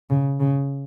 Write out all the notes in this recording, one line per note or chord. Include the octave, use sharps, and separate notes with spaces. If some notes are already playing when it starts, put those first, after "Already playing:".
C#3
C#3